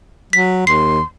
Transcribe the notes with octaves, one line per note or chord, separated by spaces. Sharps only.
F#3 B6
D#2 C6 C7